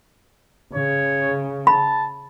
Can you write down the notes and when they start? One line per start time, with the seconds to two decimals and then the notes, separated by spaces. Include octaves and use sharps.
0.75 C#3 C#5
1.67 A5 B5